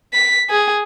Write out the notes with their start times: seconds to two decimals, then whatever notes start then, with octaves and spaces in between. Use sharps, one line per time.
0.13 B6
0.50 G#4